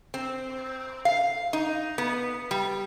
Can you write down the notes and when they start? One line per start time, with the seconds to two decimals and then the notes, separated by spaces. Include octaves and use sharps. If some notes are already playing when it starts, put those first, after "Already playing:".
0.14 C4
1.05 F5
1.53 D#4
1.98 B3
2.51 G3